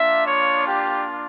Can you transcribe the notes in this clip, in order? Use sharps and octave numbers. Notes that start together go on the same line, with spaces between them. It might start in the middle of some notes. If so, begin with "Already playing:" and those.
Already playing: A#3 D4 F4 E5
C#5
G4